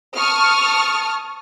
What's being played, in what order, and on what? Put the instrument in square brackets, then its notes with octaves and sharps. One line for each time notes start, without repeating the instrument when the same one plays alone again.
[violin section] A5 C#6 D#6 F6